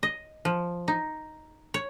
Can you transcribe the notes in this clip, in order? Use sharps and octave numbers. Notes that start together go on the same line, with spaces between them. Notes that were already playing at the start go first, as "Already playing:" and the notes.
D#5
F3
D#4
C#5